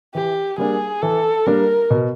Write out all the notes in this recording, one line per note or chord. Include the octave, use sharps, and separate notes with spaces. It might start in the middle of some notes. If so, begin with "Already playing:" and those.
E3 G4
G3 A#3 D4 G#4
E3 A4
G3 A#3 D4 A#4
B2